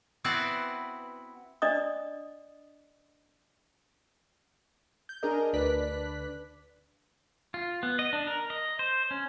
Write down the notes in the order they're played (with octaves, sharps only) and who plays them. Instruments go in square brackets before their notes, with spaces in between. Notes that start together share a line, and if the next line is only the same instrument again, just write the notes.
[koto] B3 C4 E4 F#4 B4 D5
[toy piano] D4 D5 D#5 D#6
[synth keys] G6
D4 G#4 A#4 D#5
D2 D4 B4 D5 F#6 B6
[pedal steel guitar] F4
B3
D#5
D4
A#4
D#5
C5
C#4